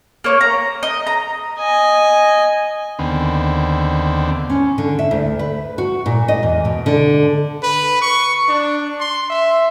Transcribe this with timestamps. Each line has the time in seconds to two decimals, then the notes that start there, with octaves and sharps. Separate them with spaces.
0.24 A#3 C#5
0.41 A#5
0.83 D#5
1.07 A#5
1.58 D#5 G#5
2.99 D#2 D3 B3 C4
4.50 C#4
4.78 D3
4.99 E5
5.11 D2
5.39 B4
5.78 F#4
6.06 A#2
6.28 D#5
6.43 E2
6.65 B2
6.86 D3
7.63 B4
8.02 C#6
8.48 D4
9.00 C6
9.30 E5